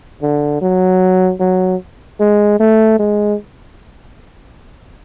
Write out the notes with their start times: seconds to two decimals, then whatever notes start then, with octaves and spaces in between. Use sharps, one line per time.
0.22 D3
0.61 F#3
1.40 F#3
2.20 G#3
2.60 A3
2.99 G#3